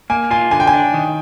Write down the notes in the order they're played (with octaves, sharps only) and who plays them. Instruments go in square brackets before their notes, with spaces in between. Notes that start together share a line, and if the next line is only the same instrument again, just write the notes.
[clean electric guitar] A#3 [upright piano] G#5
[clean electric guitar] F4 [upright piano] G#5
[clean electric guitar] D3 [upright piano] G#5
[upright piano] G5
G#5
[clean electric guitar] D4
D#3